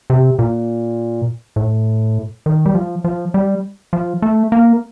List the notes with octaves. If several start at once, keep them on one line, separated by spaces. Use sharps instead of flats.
C3
A#2
A2
D#3
G3
F3
F3
G3
F3
A3
A#3